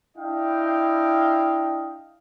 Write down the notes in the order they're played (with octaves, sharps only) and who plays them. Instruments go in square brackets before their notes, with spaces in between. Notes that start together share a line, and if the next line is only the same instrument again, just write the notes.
[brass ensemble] D4 E4 D#5 F5 G5